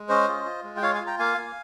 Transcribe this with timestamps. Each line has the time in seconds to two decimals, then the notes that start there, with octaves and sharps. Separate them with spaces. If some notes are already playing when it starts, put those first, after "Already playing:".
Already playing: G#3
0.09 C#4 C5 D#5
0.28 F4
0.45 F4
0.64 G#3
0.77 G5
0.82 F4 C#5 F5
0.94 F5 G#5
1.01 F4
1.07 G5 A#5
1.19 A#3 F5 G#5
1.38 A#3